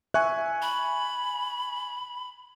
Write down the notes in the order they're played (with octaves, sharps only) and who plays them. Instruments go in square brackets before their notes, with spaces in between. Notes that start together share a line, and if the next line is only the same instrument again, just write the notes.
[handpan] E5 [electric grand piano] G#5 C#6 F#6
[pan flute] B5